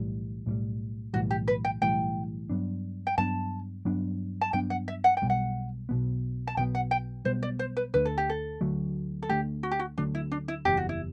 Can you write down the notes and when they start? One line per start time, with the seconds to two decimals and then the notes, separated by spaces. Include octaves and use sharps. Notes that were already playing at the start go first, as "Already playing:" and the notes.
Already playing: B1 A2 E3 G3
0.46 B1 A2 E3 G3
1.14 B1 A2 E3 G3 F#4
1.31 G4
1.48 B4
1.65 G5
1.82 B1 A2 E3 G3 G5
2.50 G2 F#3 B3 D4
3.07 G5
3.18 G2 F#3 B3 D4 A5
3.85 G2 F#3 B3 D4
4.41 A5
4.53 G2 F#3 B3 D4 G5
4.70 F#5
4.88 E5
5.04 F#5
5.17 G5
5.22 B1 B2 G3 B3
5.30 F#5
5.89 B1 B2 G3 B3
6.47 A5
6.57 B1 B2 G3 B3 G5
6.75 F#5
6.91 G5
7.25 B1 B2 G3 B3 C5
7.43 D5
7.59 C5
7.77 B4
7.94 D2 D3 F#3 A3 B4
8.05 A4
8.18 G4
8.30 A4
8.61 D2 D3 F#3 A3
9.23 A4
9.29 D2 D3 F#3 A3 G4
9.63 F#4
9.71 G4
9.79 F#4
9.98 D2 D3 F#3 A3 D4
10.15 E4
10.32 D4
10.48 E4
10.65 F#1 E2 C3 G3 G4
10.77 F#4
10.89 E4